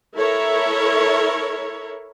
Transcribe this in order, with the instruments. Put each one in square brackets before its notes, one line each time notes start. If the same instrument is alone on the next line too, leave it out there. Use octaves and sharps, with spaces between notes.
[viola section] E4 A4 A#4 C#5 E5